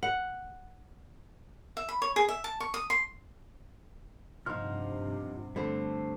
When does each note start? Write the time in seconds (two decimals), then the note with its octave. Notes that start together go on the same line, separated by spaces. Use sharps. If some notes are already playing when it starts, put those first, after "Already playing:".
0.03 F#5
1.77 E5
1.89 B5
2.02 C#5
2.16 G#4
2.29 E5
2.44 A5
2.60 C#6
2.74 D#6
2.90 C6
4.46 G2 C3 F3 D#4 F#5 C6 F6
5.56 D3 G3 A3 C4 C5